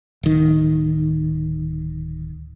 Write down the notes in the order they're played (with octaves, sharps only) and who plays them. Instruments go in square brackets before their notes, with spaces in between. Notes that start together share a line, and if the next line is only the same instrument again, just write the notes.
[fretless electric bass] D1 D#3